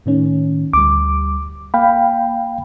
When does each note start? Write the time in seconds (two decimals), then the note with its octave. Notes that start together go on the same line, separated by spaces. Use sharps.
0.06 A2 D#3 C#4
0.74 D2 G3 D6
1.74 A#3 F5 G5 B5